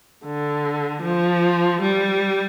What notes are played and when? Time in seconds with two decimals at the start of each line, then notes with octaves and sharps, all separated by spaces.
0.24 D3
1.02 F3
1.81 G3